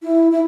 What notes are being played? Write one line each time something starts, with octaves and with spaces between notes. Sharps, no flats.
E4
E4